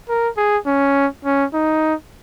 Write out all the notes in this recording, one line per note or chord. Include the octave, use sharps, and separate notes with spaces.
A#4
G#4
C#4
C#4
D#4